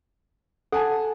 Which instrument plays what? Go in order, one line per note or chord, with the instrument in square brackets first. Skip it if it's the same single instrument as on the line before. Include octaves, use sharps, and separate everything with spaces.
[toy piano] A4 [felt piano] F#5 G#5 A5